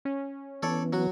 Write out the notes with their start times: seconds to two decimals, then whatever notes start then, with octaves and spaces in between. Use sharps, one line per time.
0.05 C#4
0.63 E3 B3 A4 C#5 D5
0.93 F#3 F#4